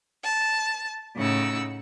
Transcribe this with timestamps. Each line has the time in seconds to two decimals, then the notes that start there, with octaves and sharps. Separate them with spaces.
0.23 A5
1.17 A2 C#3 D#4 F#5 E6